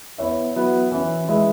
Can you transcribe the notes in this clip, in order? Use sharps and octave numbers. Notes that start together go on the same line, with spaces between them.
B3 E4 C#5 E5
F#3 B3 E4 B4
E3 C#4 E4
G#3 E4 B4 E5